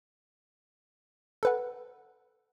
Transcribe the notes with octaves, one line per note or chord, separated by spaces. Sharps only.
A4 B4 F#5